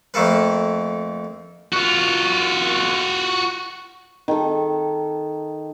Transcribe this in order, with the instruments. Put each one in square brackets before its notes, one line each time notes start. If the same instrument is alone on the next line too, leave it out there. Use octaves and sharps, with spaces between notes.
[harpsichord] F2 A3 A#3 A4 B4
[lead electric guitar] F4 F#4
[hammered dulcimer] D#3 A4